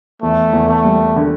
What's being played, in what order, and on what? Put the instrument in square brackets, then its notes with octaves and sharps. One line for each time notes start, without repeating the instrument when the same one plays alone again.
[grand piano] E2 [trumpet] A3
[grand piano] E2
[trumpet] A3
[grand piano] G3
D3